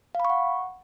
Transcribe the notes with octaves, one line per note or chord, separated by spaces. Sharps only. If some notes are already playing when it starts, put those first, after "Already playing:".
F5
B5
C#6
F#5